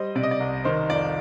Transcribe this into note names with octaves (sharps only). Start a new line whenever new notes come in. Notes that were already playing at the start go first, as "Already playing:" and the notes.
Already playing: G3 C5 D#5
C3 D5
D#5
D5
C2
D#3 C5
F2 D5